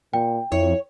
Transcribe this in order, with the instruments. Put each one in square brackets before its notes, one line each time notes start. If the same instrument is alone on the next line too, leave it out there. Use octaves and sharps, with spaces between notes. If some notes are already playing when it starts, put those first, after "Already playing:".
[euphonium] A#2 [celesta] G5
[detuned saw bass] F2 [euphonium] E4 [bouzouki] C#5